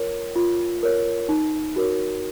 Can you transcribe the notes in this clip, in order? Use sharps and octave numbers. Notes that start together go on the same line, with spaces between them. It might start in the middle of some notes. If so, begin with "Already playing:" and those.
Already playing: F4 A#4 C#5
F4
A#4 C#5
D#4
F#4 A#4 C#5